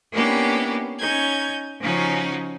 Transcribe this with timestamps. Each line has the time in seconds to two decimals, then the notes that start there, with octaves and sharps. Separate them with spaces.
0.11 A#3 B3 C#4 D4 E4 G4
0.99 C#4 D#4 G6 G#6
1.81 C#3 F3 C#4 D#4 F#4